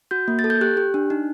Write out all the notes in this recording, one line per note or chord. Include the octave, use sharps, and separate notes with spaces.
F#4 G6
A#3
A6
A4
G6
G4 F#6
G4
D4
D#4